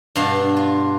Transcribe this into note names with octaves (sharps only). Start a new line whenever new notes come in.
G2 B2 D4 F5 A5
F4